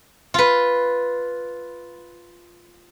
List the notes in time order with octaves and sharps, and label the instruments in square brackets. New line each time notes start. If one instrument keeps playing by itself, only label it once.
[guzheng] F4 B4